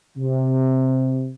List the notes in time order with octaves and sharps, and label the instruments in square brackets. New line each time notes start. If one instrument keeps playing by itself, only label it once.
[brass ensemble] C3